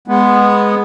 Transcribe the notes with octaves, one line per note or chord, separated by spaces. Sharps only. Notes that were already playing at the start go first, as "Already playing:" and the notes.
G#3 B3